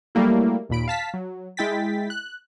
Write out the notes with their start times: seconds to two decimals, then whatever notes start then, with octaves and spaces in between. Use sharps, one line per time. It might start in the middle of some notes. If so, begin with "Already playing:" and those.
0.15 F#3 G3 A3 A#3 E4
0.69 D#2 A#2 B5 D7
0.88 F5 A5 B6
1.14 F#3
1.57 G#3 E4 G5 A6 B6
2.10 F#6